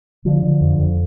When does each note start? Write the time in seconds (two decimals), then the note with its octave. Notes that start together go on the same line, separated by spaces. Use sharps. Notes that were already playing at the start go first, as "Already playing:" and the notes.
0.25 D3 F3
0.42 D3
0.61 F2
0.79 F2